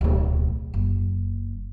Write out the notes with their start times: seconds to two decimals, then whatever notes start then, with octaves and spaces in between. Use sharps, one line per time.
0.01 D1 B1
0.74 F#1